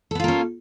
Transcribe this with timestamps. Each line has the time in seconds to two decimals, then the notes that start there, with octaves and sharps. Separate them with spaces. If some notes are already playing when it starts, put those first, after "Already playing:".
0.11 A4
0.15 B3
0.20 F4
0.24 A#3
0.28 C#4